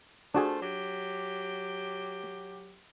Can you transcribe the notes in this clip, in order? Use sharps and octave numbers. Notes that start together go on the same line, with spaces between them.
A3 D4 F4 F#4 G#4 C5
F#3 G4